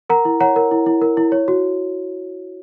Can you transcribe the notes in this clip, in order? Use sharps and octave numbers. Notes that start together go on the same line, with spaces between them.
A#4 F#5 A#5
E4
C#5 F#5 A#5
A#4
E4
E4
A#4
E4
C#5
F#4